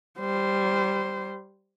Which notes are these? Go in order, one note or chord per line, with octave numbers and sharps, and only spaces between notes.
G3 C5